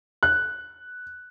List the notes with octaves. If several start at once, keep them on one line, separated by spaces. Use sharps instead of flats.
F#6